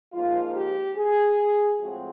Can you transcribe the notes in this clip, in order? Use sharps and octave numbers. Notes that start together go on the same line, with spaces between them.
G#2 F3 A#3 F4
G4
G#4
A2 F3 G#3 C4 F#4